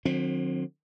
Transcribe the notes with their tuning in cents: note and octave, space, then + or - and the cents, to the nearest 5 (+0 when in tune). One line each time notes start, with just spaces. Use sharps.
D3 +40 F#3 -45 C4 +20